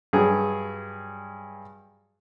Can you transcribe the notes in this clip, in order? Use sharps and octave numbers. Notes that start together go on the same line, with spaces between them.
G2 F#3 G#4